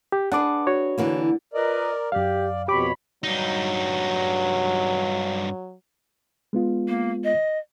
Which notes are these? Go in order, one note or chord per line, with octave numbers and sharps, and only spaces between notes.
G4
D4 G#4 B4 F#5 A5 D6
F#4 C#5
D3 E3 A#3
F4 A#4 B4 D5 D#5
F#2 G4 D5 F5
F2 B2 G4 C#5 B5 D6
G2 F#3 D#4
G#3 B3 F4
A#3
D#5